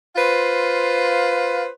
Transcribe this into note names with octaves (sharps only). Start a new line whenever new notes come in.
F4 B4 C5 F5